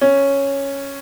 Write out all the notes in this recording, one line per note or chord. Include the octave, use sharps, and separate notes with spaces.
C#4